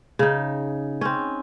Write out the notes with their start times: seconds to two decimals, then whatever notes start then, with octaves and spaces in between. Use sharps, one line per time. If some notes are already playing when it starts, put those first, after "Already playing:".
0.19 C#3 D#4
1.01 C4 C#4